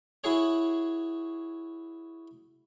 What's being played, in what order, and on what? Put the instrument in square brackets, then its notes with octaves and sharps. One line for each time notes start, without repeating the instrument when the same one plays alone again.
[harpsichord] E4 F#4 G#4 C#5